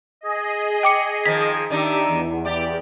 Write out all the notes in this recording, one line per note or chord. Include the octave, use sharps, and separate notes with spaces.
G#4 D#5
G5 D6 C#7
D#3 F3 B6
D#3 D4 D#4 G4 E5
E2
G4 D5